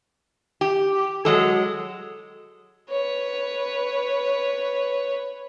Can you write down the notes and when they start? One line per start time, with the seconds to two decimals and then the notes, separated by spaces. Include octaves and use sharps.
0.61 G4
1.25 F#3 G#3 A4
2.90 B4 C#5